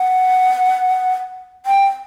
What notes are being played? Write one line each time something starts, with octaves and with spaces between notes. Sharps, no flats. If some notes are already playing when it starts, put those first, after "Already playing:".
Already playing: F#5
G5